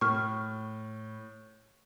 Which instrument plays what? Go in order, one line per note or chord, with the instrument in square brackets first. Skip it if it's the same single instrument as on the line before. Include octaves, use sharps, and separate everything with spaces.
[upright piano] A2 [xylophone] C#6 F6